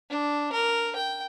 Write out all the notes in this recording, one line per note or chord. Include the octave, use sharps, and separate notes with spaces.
D4
A#4
G5